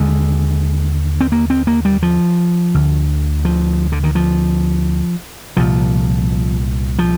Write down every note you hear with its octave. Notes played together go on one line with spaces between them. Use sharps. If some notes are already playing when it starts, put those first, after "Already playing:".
Already playing: D#2 D3 G#3
C4
A#3
C4
A#3
G3
F3
D2 D3
F3
D3
D#3
F3
C2 A#2 F3
F3